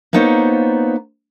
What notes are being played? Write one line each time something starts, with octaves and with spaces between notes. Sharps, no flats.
A#3 B3 D#4 F4 C5 C#5